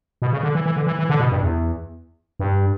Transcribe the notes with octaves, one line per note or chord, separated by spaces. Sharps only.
B2
C#3
D3
E3
E3
D3
E3
E3
D3
B2
G2
E2
G2